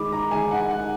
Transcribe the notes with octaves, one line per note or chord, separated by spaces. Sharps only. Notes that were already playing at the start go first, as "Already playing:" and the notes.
Already playing: D#3 G#3 B5 D6
A#5
D#3 G#3 G#5
F#5
F#5